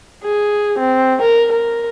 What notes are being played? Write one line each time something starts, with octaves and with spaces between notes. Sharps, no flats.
G#4
C4
A#4
A#4